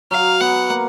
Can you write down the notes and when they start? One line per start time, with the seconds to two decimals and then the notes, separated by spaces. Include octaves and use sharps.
0.11 F#3 F5
0.41 B3 F#5
0.70 A#3